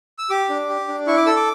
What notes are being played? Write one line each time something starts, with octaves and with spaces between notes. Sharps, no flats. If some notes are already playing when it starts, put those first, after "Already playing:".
E6
G4 D6
D4
G4
D4
E4 C#6
D6
A4 E6
D6